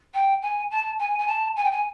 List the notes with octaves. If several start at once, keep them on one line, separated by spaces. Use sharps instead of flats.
G5
G#5
A5
G#5
G#5
A5
G#5
G5
G#5